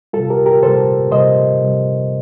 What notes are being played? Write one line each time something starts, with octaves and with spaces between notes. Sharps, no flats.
C3 G3 F4 A4
G4 A#4
G4 A#4
C3 G3 A4 C5
C3 G3 C5 D#5
C3 G3